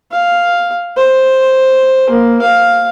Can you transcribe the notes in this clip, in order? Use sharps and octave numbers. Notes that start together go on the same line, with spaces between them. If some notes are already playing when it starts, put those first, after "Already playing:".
F5
C5
A#3
F5